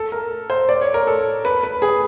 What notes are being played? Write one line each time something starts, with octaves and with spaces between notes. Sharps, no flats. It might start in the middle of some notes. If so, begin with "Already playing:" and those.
Already playing: A4
A#4
C5
D5
C#5
A#4
A4
B4
B4
G#4